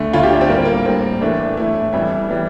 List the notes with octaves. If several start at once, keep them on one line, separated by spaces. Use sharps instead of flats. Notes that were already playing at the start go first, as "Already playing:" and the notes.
Already playing: D2 D3 A3
D2 D3 A3 F4
G4
D4
C4
A2 G3 A#3
C4
A#3
A2 G3 C4
A2 E3 A3 D4
A2 E3 A3 E4
F2 E3 G3 E4
E3 G3